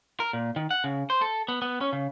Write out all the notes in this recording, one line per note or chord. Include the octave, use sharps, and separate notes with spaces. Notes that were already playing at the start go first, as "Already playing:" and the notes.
A#4
A#2
D#3
F#5
C#3
C5
A4
B3
B3
C#4
C#3